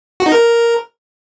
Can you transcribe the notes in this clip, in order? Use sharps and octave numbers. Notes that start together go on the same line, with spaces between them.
F#4
D#4
A#4